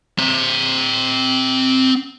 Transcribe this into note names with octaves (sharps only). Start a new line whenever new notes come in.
C4 A#5